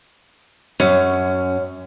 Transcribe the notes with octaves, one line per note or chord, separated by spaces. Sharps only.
F#2 C#4